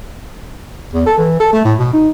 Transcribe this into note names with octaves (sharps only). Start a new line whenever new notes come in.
E2
A4
E3
A4
A3
A2
B2
D#4